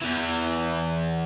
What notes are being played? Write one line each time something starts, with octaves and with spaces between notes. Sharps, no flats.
E2 E3